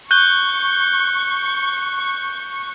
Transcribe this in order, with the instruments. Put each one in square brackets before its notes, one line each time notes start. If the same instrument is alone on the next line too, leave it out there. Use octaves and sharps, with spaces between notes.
[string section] C#6 [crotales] F#6 G6 G7